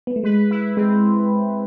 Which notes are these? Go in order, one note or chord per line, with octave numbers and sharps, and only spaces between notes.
B3
A3
G#3 B4
E4
G#3 C4